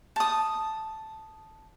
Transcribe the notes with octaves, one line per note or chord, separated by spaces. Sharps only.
A5 D#6